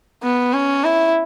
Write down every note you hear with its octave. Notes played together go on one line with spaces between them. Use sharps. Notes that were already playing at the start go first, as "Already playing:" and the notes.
B3
C#4
E4